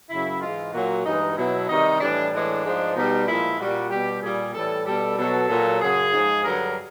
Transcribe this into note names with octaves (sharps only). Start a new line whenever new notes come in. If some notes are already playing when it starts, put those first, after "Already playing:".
F#2 C#3 F#3 E4
G#2 E3 G#3 F4
A#2 F#3 F#4
G2 E3 G#3 D#4
B2 F#3 E4
C3 D#3 G3 D#4
A2 E3 G3 D4
A2 E3 G#3 D4
G#2 F3 G#3
B2 G3 D#4
A#2 F3 G#3 E4
A#2 G3 F#4
B2 G3 G4
A#2 G3 G#4
A2 E3 G3 A4
B2 G3 A4
B2 F#3 A4
A#2 F#3
F#2 C#3 F#3 G#4
G#2 F3 G#3
G2 D3 F#3 A#4